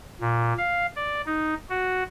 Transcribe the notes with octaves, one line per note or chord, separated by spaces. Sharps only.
A#2
F5
D5
D#4
F#4